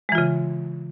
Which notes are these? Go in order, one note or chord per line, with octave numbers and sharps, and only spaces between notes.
C#3 E3 G#3 F4